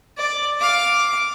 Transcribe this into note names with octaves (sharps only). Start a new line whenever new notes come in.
D5
F5 D6